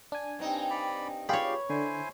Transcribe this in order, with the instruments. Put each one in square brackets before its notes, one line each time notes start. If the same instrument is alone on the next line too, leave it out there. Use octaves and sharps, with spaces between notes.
[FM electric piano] D4 G#5
[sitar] G2 C4 D#4
[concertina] D5 B5
[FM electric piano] F4 G4 G#4 [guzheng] C#5 B5 [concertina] D5 F5
[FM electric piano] D3 [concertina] E4 C5 G#5